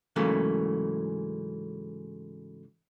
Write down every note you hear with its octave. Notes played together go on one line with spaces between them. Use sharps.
G#2 C#3 E3 F#3 A3 A#3